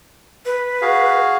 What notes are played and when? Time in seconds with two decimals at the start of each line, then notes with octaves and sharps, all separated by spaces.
0.46 B4
0.82 F#4 G#4 F5